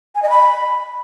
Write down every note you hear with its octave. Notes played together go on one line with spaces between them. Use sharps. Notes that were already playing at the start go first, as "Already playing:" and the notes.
G#5
D#5
B5